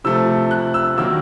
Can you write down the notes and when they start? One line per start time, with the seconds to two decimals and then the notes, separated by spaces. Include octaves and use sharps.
0.04 C3 F3 A3 E6
0.51 F#6
0.74 E6
0.97 D#3 F#3 A#3 E6